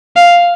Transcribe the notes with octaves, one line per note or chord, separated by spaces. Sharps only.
F5